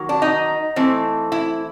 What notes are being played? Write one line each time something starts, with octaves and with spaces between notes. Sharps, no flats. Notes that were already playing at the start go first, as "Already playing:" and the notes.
Already playing: D#3 F#3 A#3
D4
D#4
E3 A3 C4
E4